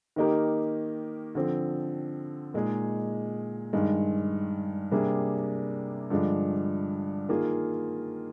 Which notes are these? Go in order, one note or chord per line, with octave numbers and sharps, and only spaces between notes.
D#3 A#3 D#4 G4 A#4
D3 F3 C4
A#2 G#3 D#4 G#4
G2 D#3 G#3
C3 G3 A#3 D4 G#4
G2 D3 F3 G#3 D4
D#3 A#3 F4 G#4